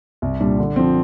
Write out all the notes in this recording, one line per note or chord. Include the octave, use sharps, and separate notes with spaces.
C2
A#2 G3 D4
D3
F3 C4